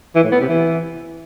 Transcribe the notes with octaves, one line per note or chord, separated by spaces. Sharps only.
E3
A2
B3
C3
E3